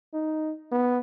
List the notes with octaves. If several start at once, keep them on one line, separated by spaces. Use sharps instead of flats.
D#4
B3